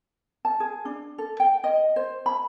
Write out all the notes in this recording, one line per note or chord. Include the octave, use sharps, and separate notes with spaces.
A5
G#4
D4
A4
G5
D#5
C5
B5